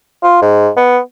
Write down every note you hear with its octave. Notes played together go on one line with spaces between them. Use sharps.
F4
G#2
B3